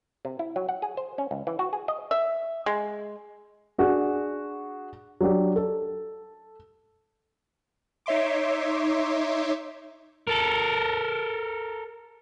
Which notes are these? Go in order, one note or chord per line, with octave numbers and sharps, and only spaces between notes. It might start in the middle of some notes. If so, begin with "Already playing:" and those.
C3
E4
F#3
F#5
G#4
C5
C#4
C#2
E3
F#4
G#4
D#5
E5
G#3
D4 F#4 G#4
F#3 D4 G4
A4
D#4 C#5 E5 C6 D6
A4 A#4